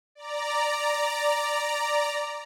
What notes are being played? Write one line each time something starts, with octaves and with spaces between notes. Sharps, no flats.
D5 A#5